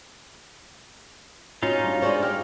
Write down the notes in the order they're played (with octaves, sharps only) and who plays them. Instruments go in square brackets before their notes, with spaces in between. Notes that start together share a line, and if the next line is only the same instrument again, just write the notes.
[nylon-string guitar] C#4 F#4 [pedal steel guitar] D#4 F4 F5
[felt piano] G2
[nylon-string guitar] G#3 G#4 C5 [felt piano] D4 D5 C#6
[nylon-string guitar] G#3 G4 [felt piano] F6